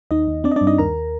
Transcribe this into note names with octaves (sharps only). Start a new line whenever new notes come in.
D#2 D#4 D#5
D#2
C4 D4 D5
D#5
D4 D5
G2
D#4 D#5
D#2 A#4 A#5